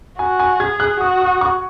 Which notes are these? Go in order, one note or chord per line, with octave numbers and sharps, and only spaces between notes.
F#4 G#5
G#5
G#4 G#6
F#6
F#4 D#6
D#6
C#6